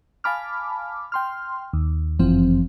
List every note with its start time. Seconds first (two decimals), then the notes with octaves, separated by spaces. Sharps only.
0.24 F5 G#5 A5 B5 D6 F6
1.12 G5 C6 F6
1.73 D#2
2.19 G1 F#2 E3 F3 C4